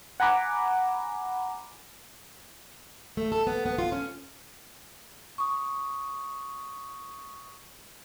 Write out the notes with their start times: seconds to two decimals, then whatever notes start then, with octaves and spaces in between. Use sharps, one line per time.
0.20 F#5 G#5 A#5 B5 D6
3.17 A3
3.32 A4
3.47 B3
3.66 B3
3.78 F4
3.92 C#4
5.38 C#6 D#6